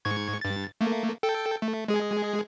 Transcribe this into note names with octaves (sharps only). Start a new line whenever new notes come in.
G#2 C#6 G#6
G2 A6
A3 A#3
A4 G5
A3
G#3 G#4